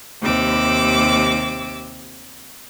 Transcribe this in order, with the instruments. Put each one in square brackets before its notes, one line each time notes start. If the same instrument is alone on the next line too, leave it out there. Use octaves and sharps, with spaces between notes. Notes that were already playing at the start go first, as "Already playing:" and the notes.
[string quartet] D#2 C3 D6 E6